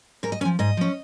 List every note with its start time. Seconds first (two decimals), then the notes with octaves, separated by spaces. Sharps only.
0.23 G#2 A#4
0.32 D#5
0.41 C#4 G#5
0.45 F3
0.59 G#2 D#5
0.77 F3 C#4